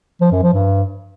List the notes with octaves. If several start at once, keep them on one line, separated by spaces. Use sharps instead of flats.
F3
F#2
F3
G2